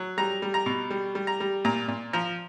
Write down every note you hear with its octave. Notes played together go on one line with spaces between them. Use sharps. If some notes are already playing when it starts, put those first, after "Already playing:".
Already playing: F#3
G3 A#5
G3
A#5
B2
G3
G3
A#5
G3
A#2 A#5
A#2
F3 A#5